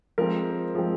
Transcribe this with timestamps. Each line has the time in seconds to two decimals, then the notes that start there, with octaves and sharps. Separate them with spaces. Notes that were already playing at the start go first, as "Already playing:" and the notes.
0.18 F3 G#3 C4 A#4
0.75 F3 G#3 C4